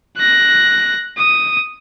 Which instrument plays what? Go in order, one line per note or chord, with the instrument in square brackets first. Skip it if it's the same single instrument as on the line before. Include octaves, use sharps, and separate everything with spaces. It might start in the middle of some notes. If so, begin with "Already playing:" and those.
[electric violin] F#6 A#6
D#6